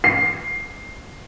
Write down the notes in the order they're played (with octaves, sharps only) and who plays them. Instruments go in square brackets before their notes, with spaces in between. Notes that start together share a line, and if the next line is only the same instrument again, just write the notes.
[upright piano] C7